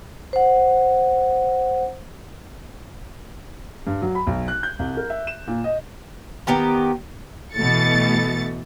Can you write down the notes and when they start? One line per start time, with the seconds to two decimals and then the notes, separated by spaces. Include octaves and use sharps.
0.33 C5 F#5
3.87 G2
4.02 F#3
4.15 B5
4.27 B1
4.48 F#6
4.63 G6
4.79 C2
4.97 A#4
5.10 E5
5.27 E7
5.47 A#2
5.64 D#5
6.47 D#3 B3 G4 A#5
7.54 B2 E3 A3 A6 C#7